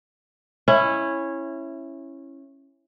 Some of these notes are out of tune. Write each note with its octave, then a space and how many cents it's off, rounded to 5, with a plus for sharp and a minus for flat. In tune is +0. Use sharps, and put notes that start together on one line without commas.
C#4 -15 E4 +5